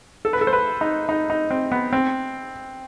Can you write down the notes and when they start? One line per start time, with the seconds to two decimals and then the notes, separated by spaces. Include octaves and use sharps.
0.25 A4
0.33 B4
0.41 A4
0.47 C5
0.53 B4
0.81 D#4
1.09 D#4
1.30 D#4
1.51 C4
1.72 B3
1.93 C4